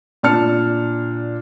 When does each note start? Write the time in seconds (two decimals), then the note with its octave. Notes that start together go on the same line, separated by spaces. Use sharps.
0.23 A#2 D4 A5 F6 C#7